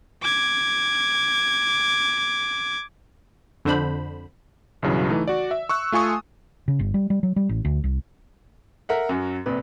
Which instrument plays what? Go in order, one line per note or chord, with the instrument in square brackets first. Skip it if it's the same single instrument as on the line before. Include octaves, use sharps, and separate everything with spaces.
[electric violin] D6 G#6
[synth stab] F2 D3 D4 C5 B5
[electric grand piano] B1 G2 C#3 E3 F#3
E3 A3 D#4
F#4 D5
E5
C#6 E6 F#6
A3 F4 G#5 C#6 D#6
[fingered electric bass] C#3
G1
G3
G3
F#3
G3
A1
D2
C2
[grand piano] A#4 E5 F#5
F#2 F#3
A#1 C3 B4